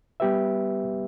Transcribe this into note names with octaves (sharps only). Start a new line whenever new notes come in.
G3 B3 G4 B4 E5